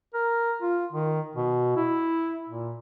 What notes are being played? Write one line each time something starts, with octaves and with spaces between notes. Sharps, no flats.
A#4
F4
D#3
B2
E4
A#2